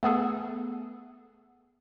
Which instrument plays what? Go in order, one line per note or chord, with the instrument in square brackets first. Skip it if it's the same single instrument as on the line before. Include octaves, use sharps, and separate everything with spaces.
[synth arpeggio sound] A3 B3 G#4 A4